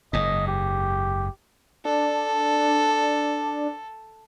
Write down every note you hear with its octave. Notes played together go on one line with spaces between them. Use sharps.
F#1 G#2 D#5
G4
D4 A4